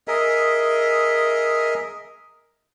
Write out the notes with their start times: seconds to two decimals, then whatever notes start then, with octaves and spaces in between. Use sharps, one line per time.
0.08 G#4 A#4 D#5 E5